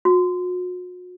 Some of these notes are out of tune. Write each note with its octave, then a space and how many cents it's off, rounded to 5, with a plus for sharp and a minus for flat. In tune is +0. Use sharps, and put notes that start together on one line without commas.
F#4 -40